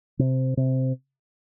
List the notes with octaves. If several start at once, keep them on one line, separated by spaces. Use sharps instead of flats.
C3
C3